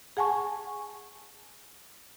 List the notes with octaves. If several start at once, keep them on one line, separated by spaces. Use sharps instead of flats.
G#4 F#5 G#5 A5 C#6